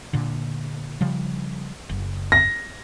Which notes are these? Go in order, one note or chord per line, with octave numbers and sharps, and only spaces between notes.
A#2 D3
C#3 F3 G3
F#1
A#6